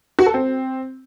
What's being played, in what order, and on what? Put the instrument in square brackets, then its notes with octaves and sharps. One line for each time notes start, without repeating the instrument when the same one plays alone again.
[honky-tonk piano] F#4
A4
C4